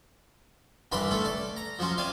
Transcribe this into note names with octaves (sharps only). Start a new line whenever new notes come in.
C2 G2 E3 D5 B5 C6
A3 C#4 A4
D5
A#5
F3 F#3 C#4 F4
C3 D5 F5 G#5